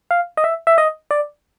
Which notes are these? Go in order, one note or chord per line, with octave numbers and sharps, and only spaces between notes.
F5
D#5
E5
E5
D#5
D5